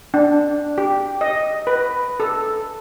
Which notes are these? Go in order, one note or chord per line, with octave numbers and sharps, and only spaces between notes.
D4
G4
D#5
B4
A4